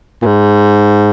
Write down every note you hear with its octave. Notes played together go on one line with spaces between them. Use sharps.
A#2
G#2